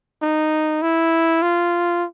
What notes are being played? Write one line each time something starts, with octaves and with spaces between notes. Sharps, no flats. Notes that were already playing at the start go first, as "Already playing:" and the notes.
D#4
E4
F4